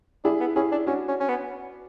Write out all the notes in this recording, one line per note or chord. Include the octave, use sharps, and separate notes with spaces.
D4 E4 G#4
B3
C#4 E4 G#4
D4
C#4 D4 F#4
C#4
C#4
B3